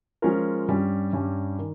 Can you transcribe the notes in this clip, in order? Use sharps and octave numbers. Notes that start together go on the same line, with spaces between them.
F3 G#3 C#4 F4 A#4
G2 G3 C#4
G2 G3 C#4
D#3